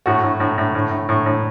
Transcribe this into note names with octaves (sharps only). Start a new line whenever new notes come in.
A2 F#4
A2
A2
A2
A2
A2
A2
A2